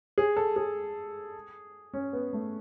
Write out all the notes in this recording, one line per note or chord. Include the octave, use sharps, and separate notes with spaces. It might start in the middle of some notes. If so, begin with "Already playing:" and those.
G#4
A4
G#4
C#4
B3
A3